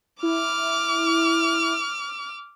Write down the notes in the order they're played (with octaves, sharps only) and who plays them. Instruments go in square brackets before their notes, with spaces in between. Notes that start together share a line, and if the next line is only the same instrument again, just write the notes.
[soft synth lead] E4 [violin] D6 F6